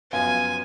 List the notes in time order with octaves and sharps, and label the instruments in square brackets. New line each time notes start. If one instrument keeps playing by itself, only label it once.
[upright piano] F#2 F3 B3 F4 [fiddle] G#5